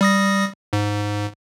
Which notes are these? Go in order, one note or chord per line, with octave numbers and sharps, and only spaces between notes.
G3 D#6 A#6
G#2